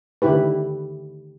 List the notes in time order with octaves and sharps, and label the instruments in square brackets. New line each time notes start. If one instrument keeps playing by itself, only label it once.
[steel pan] D3 D#3 E4 G4 B4